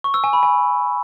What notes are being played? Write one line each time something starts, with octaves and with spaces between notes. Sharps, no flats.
C#6
E6
G#5
B5
G#5